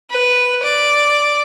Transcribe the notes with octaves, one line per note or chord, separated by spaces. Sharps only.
B4
D5